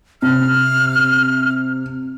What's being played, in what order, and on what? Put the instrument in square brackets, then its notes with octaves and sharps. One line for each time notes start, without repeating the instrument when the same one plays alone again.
[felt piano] C3 [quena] F6